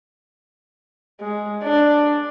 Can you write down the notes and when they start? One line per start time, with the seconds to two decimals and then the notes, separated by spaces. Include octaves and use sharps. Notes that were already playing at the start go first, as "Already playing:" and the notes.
1.21 G#3
1.63 D4